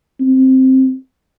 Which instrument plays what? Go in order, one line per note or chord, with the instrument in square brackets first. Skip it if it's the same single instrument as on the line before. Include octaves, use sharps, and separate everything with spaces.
[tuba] C4